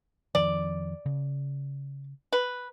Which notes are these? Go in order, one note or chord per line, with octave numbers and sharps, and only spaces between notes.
F2 D#3 F3 D5
C#3
B4